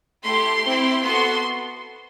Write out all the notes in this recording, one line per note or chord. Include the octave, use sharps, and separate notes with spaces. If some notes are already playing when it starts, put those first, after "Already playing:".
A3 E4 G4 C6
C4 E4 G4
B3 F#4 A4 C6